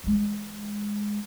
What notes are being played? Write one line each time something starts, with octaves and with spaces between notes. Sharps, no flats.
E3 G#3